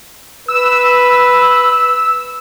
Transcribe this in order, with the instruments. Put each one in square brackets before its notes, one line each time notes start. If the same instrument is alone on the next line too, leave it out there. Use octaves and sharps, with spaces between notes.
[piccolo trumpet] B4 [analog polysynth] E6